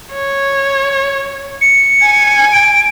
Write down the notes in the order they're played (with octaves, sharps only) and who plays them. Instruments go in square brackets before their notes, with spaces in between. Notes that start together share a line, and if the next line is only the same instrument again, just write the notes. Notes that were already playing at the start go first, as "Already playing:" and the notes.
[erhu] C#5
[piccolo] C#7
[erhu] G#5
[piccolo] D7